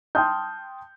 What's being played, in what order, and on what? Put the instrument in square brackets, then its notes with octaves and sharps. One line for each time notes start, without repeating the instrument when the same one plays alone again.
[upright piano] G5 A5 C6 D#6 F6 G6